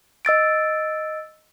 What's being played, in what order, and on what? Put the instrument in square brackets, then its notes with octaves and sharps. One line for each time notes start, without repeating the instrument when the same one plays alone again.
[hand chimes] D#5 E6 A6 D7